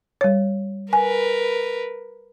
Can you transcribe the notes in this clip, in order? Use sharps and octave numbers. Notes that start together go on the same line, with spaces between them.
G3 C#5
A#4 B4 G#5